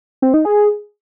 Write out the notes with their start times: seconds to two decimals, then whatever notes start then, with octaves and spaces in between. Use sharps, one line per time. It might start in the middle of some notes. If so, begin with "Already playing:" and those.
0.22 C4
0.34 D#4
0.45 G#4